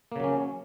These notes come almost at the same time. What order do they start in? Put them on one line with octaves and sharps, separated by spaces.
A#3 C#3 F#3 C#4